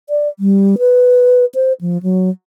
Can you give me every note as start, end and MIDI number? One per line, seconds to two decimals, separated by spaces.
0.09 0.28 74
0.39 0.75 55
0.78 1.45 71
1.54 1.73 72
1.81 2.01 53
2.03 2.30 54